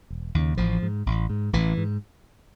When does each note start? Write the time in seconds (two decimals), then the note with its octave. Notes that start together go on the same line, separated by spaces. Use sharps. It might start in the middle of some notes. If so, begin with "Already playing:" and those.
0.10 E1
0.35 D#2 C#3
0.57 A1 F3
0.82 G#2
1.06 A1
1.30 G#2
1.53 A1 E3
1.77 G#2